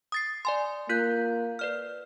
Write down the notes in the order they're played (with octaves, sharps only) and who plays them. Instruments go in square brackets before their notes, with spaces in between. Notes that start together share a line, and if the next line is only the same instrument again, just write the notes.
[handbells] D#6 A6 C7
D5 G#5 C6
[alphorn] A#3 [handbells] F4 F#6 G6
[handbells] B4 D5 F6